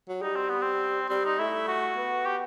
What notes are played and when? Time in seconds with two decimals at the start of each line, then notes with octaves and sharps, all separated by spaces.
0.09 F#3
0.22 G3 D#4
0.36 C4
0.49 B3
0.62 C4
1.09 G3 C4
1.25 D#4
1.39 A3 E4
1.68 F#4
1.97 B3
2.26 G4